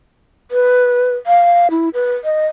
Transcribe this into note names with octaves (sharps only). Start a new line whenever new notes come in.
B4
F5
E4
B4
D#5